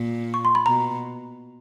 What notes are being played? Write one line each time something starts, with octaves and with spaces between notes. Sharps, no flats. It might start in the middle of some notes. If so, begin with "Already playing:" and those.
Already playing: A#2
C#6
C6
B5
B2 A#5